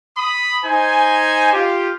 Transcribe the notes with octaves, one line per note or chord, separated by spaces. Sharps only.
B5 D#6
D#4 C5 G#5
F4 G4